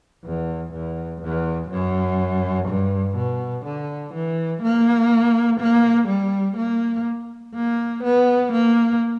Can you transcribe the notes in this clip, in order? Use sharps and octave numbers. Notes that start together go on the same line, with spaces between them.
E2
E2
E2
F#2
G2
B2
D3
E3
A#3
A#3
G3
A#3
A#3
B3
A#3